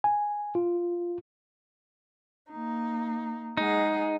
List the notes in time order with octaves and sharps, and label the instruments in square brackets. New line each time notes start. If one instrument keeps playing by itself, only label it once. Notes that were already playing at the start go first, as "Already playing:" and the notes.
[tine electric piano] G#5
F4
[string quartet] A#3 D#4
[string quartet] G#3 G#4 F#5 [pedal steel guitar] D#4